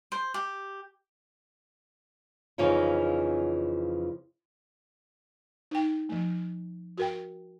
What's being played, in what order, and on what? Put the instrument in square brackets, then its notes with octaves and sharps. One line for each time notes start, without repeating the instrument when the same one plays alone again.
[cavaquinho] C5
G4
[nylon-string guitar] F2 C#3 E3 F3 C#4 D#4
[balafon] D#4 G5
F3 A3
F#4 A#4 G5